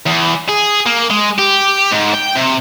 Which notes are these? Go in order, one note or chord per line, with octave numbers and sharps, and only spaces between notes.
E2
G#4
A#3
G#3
G4
G#2
G5
C3